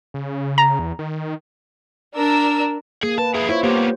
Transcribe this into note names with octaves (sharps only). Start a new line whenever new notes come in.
C#3
A#5
E2
D#3
D4 A#4 E6
A#3 G#4
B4 A5
E4 G#4
E4 F4 C5 C#5
A#3 B3 G4 C5